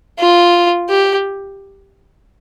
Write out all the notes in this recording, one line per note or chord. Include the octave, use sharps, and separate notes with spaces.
F4
G4